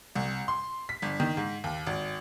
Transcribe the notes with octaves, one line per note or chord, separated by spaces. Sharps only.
C2
C6
B6
G1
D#3
G#2
D#2
G#1